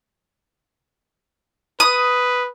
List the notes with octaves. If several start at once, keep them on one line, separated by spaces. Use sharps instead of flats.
B4 D#6